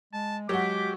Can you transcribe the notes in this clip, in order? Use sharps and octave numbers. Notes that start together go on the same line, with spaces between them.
G#3 A5
F#3 G#3 F#4 G4 D6